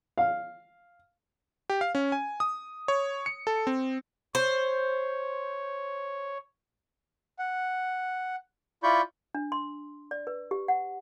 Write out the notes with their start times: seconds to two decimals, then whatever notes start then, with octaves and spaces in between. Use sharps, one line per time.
0.18 F5
1.70 G4
1.81 F5
1.95 C#4
2.12 G#5
2.40 D#6
2.88 C#5
3.26 C#7
3.47 A4
3.67 C4
4.35 C5 C#5
7.39 F#5
8.83 E4 F4 D5 B5 C#6 G6
9.34 D4
9.52 C6
10.11 D5
10.27 B4
10.51 G4
10.68 F#5